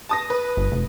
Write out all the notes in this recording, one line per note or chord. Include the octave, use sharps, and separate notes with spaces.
A5 D#6 A#6
B4
G1
F1